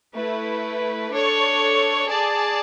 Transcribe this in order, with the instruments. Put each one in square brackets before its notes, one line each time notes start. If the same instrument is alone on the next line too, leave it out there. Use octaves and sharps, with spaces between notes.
[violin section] A3 E4 B4
D4 A4 C#5
G#4 D5 A5